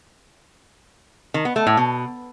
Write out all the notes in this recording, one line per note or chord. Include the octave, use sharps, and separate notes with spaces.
D#3
B3
A3
A2
B2